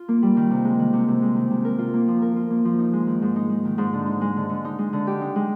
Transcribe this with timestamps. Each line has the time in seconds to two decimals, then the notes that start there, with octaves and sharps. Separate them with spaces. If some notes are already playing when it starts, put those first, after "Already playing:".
Already playing: F4
0.08 A#3
0.22 G3
0.37 D#3
0.50 C3
0.64 G#3
0.79 D#3
0.93 C3
1.08 C3
1.22 G#3
1.36 D#3
1.50 C3
1.65 A#4
1.79 F4
1.94 A#3
2.08 F3
2.22 A#4
2.36 F4
2.50 A#3
2.65 F3
2.79 D#4
2.93 G#3
3.07 D#3
3.22 G#2
3.36 D#4
3.50 G#3
3.65 D#3
3.78 G#2
3.93 D3
4.07 D#4
4.21 G#3
4.36 D3
4.49 D3
4.65 D#4
4.79 G#3
4.93 D3
5.07 G4
5.21 D#4
5.36 G#3